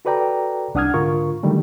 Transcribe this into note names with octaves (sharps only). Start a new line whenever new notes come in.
F#4 A4 B4 D5 G5 A#5
C2 D4 F#5 D#6 F6 G#6
G#2 D3 F4 A#4 C#6
D3 D#3 F#3 G3 A3